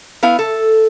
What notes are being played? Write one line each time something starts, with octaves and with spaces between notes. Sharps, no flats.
B3 E4 F5
A4